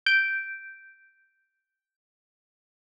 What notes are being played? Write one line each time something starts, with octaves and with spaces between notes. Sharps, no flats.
G6 D7